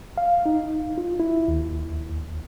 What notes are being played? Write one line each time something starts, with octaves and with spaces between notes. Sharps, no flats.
F5
D#4
F4
E4
D#2